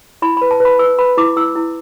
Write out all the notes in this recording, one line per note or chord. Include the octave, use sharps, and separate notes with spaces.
E4 B5
B4 B5
A5
B4 B5
B4 E6
B4 B5
E4 D6
E4 E6
E4